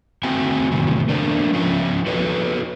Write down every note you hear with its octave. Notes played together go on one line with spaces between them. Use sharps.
A3 C4 F#4 E5 G5 G#5
A2 C3 D#3 F#3
A3 D4 A#4 C5
F3 C#4 F4 G4 D#5 E5
F#4 A4 B4 C#5 D#5